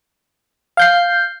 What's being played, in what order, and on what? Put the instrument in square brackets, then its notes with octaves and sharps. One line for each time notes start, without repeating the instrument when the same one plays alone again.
[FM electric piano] F5 G6 C7